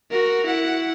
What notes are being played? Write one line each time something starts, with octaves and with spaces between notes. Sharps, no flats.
F#4 A#4
E4 F#5